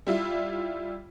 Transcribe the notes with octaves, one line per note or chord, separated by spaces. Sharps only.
G3 E4 F4